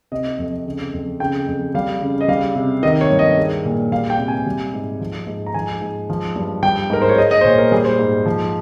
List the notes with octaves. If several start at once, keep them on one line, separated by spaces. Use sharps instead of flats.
C3 D#5
F2
C#3
F2
C#3 G5
F2
G3 F5
C#3
D#5
G3 F5
C3
D#3 D#5
C#5
G2
D#5
G#3
A#2
G3 F5
G5
C3
G#5
G3
G#2
F3
G#2
A#5
F3 G#5
G#2
F3
G2
G3 G5
G#2 A#4
C5
C#5
G#3 D#5
D#5
C5
A#2 C#5
A#4
G3 G#4
C5
G#2
F3